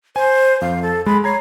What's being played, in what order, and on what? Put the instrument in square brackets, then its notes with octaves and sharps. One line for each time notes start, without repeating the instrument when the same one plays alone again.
[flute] C5 [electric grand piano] G#5
[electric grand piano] F2 [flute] F5
[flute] A4
[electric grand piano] G#3 [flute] B5
[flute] C#5 [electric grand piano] A#5 G#6 C7